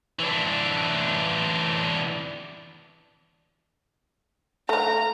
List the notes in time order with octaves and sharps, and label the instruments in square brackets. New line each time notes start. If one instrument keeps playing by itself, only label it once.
[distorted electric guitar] E3 D4
[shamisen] A3 F5 [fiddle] A#5